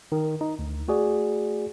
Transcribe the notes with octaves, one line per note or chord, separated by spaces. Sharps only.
D#3
D#4
D2
A3 F#4 G#4 D5